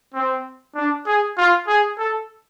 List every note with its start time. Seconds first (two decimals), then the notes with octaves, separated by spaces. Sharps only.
0.14 C4
0.75 D4
1.06 G#4
1.37 F4
1.67 G#4
1.98 A4